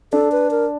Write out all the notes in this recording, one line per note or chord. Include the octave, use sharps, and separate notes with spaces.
D4 A4
B4
A#4